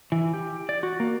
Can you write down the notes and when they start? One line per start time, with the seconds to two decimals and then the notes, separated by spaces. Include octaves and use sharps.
0.12 E3
0.33 G4
0.69 D5
0.83 F#4
1.00 A#3